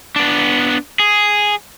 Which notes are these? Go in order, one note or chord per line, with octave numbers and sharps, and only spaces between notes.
B3 D4
G#4